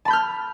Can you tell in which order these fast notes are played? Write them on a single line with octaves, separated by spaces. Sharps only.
A5 B5 G6 F6